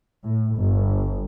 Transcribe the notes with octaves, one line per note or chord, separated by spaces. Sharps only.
A2
G1